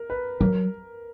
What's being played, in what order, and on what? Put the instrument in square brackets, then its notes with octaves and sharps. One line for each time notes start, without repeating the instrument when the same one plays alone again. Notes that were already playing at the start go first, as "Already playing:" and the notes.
Already playing: [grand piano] A#4
B4
[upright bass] F#3 [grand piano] A#4